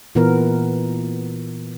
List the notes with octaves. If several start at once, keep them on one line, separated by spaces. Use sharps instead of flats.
A#2 E3 B3 A#4